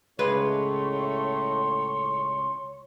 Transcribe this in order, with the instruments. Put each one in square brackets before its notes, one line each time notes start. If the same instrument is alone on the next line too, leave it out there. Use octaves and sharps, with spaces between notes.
[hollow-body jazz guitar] C#2 G#3 B4 [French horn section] A2 A3 [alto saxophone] C#5 [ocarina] C6